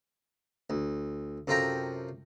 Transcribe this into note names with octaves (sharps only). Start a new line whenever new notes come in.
D2
F#2 C3 F4 A4 G5 A#5